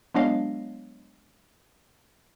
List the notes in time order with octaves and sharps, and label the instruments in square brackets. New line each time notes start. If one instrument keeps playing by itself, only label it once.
[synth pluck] F#3 G#3 B3 D4 D#5 F5